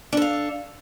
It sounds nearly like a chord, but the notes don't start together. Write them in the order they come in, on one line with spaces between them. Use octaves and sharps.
D4 A4 F5